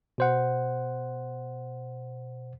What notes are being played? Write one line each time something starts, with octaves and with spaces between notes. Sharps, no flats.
B2 C5 F#5